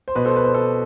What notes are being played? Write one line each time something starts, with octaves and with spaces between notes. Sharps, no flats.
C5
B2 B4
A4 C5
B4
A4 C5
A4 C5